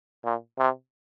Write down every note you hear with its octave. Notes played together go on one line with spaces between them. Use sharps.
A#2
C3